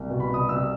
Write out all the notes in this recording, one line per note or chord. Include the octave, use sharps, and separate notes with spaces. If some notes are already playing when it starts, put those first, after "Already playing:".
Already playing: C2
B2
B5
C2 D#6
C2 E6